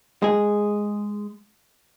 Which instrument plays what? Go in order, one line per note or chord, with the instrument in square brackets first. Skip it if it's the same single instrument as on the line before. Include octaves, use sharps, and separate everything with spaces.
[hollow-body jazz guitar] G#3 G#4